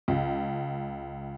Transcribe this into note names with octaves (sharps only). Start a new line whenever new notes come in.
C#2